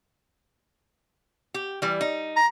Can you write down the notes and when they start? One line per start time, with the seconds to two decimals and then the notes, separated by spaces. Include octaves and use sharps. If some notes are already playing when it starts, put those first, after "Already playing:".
1.54 G4
1.82 E3 G3
2.01 D#4
2.37 A#5